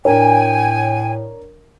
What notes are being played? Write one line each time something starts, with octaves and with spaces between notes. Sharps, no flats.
A2 D4 A#4 C#5 G5 G#5